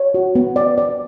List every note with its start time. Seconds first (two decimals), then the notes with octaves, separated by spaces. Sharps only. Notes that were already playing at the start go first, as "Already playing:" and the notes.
Already playing: C#5
0.14 F#4
0.35 B3
0.56 D5
0.78 D5